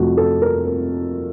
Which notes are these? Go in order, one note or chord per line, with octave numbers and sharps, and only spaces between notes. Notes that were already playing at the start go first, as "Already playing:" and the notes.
Already playing: F2 C3 F3 A3 F4 F#4
A4
A#4
A#4